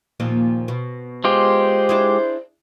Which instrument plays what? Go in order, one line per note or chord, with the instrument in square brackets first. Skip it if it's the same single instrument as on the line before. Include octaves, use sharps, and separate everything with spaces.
[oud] D#2 A#2 F3
B2
[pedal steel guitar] G#3 F4 G4 [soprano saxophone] C5
[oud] D4 E4 G#4